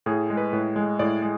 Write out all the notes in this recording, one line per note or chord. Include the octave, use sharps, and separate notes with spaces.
A2 G#4
G#3
B4
A2
G#3
A2 D5
G#3